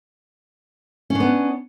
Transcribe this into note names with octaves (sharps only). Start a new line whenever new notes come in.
B3 C#4 D4